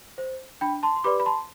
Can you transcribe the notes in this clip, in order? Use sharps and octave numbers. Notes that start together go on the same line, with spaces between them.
C5
D4 G5 B5
A5 C6
C6
G4 B4 D5 B5 D6
B5
A5 C6